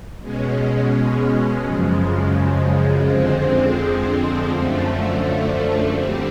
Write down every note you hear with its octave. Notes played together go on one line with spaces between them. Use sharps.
B2 G#3 C#4
F#2 C#3 F3 G#3
F2 D3 F3 G#3 C4
F#2 D3 F3 A3
D3 G3 C4